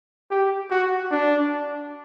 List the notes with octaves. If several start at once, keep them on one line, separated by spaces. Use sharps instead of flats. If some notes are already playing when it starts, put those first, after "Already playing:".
G4
F#4
D4